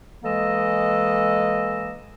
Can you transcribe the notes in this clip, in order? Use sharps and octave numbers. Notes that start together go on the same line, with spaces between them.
E3 G#3 A#3 A4 D#5 E6